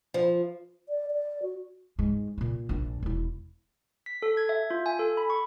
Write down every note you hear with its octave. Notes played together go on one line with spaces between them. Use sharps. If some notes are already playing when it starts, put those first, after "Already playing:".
F3
D5
D5
F#4
G#2 G#3
A#2 A#3
A#1 D4
E1 E4
B6
A4
G#6
E5
F4
G#5
A4
B5
C#6